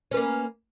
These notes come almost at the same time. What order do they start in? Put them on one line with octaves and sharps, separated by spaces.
C#4 B4 A#3